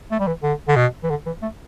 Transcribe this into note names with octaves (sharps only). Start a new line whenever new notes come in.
A3
G3
E3
D3
D3
B2
E3
D3
E3
A3